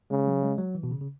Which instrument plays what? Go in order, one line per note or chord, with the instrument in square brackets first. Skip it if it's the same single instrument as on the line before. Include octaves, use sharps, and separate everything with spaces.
[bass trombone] C#3 [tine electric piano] G#3
[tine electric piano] F#3
G#3
F#3
E3
B2
C#3
C#3